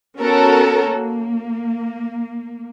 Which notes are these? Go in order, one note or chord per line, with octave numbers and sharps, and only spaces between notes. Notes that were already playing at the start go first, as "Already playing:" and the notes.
B3 C#4 F#4 A4 A#4
A#3